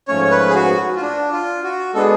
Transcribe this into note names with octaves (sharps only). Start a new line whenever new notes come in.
G#2 F3 A3 C#4 C#5
C#5
B4
G#4
F#4
F4
D4
F4
F#4
G#3 B3 D4 G#4 A4 B4